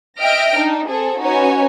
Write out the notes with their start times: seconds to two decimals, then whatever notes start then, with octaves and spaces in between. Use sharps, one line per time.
0.20 D#5 E5 G5 F6 A#6 D7
0.56 D4 D#4
0.88 C4 G#4 A4
1.21 C#4 D#4 F#4 B4 C#5 G#5